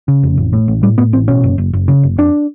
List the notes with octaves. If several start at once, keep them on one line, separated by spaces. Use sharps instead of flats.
C#3
F1
A1
A2
A1
A2 G3
A2 B3
A1 C4
B2 C#4
F#1
F#1
F#1
C#3
F#1
F2 D4